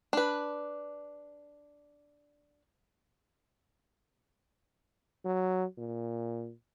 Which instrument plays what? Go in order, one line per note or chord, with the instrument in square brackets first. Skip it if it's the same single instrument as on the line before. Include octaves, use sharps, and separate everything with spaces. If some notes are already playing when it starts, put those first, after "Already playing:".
[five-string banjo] D4 B4
[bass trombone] F#3
A#2